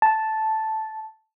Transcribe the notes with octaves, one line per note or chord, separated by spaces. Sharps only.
A5